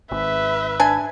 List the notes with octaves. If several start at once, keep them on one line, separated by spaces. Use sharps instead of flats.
G#1 B4 E5
D4 G#5